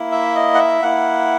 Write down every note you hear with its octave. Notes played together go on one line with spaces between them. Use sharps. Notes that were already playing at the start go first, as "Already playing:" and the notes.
Already playing: A#3 E4
E5
D#5
F#5
E5
A#3 E4 F#5